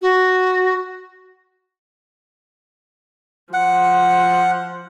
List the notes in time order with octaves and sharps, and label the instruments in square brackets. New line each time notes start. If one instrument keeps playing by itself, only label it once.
[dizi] F#4
[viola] F3 [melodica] F#5